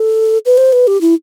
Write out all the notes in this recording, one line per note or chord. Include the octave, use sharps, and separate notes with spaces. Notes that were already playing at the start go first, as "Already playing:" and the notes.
Already playing: A4
B4
C5
B4
G4
E4